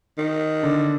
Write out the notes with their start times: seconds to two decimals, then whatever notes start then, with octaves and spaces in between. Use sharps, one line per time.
0.18 D#3
0.63 D3 D4